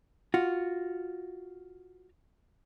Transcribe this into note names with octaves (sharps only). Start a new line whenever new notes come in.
F4 F#4